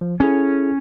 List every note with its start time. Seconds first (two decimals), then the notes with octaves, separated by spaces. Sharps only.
0.01 F3
0.20 C#4 E4 G#4 A4